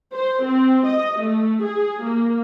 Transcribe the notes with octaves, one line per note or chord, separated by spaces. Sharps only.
C5
C4
D#5
A3
G#4
A#3